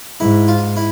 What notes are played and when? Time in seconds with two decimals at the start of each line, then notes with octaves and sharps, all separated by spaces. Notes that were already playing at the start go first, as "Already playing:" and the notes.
0.20 G#2 E4
0.48 F4
0.76 E4